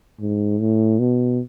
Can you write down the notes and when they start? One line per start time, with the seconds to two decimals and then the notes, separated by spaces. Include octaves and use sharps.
0.20 G#2
0.60 A2
0.99 B2